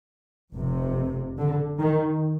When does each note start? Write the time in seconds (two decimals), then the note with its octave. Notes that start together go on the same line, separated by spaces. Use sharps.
0.52 F1 F2 C3
1.37 D3
1.79 D#3